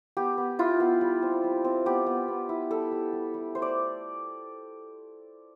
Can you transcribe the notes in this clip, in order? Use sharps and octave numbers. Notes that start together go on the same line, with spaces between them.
B3 G4
B3
E4 F4
B3
G3
C4
G3
C4
B3 G4
B3
B3
E4
G3 A4
G3
G3
G3
A3 C5
D5